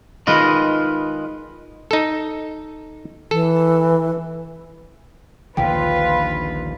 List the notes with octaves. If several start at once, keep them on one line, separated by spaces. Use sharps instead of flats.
D#3 G#3 F4 B4 D#5
D#4 A4
E3 A4
A#1 D#2 D3 F4 B4 F5 G5